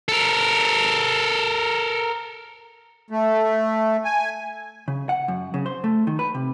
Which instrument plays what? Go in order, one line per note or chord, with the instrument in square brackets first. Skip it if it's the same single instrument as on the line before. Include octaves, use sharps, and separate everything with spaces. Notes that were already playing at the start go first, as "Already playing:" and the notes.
[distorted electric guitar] A4 A#4
[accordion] A3
G#5
[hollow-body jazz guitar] C#3
F#5
F#2
C#3
C5
A3
D#3
B4
C3